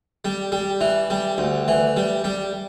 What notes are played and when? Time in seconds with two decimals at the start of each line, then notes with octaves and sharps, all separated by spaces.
0.25 G3
0.52 G3
0.81 E3
1.10 G3
1.38 D2
1.68 E3
1.97 G3
2.24 G3